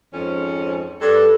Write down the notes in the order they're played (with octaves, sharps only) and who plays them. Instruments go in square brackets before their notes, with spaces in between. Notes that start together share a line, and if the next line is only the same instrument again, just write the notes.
[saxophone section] F2 G#2 C#4
[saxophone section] G2 D4 B4 [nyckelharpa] A4